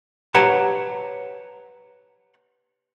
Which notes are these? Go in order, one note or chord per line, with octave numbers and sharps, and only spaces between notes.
G4 B4 C#5 F#5 A5 A#5